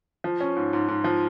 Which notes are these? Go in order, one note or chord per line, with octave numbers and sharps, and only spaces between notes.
F3
C#4
G#2
G#2
G#2
F3